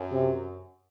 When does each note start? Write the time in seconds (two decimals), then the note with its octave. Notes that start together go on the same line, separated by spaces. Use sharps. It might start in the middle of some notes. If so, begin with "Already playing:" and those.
Already playing: F#2
0.12 C3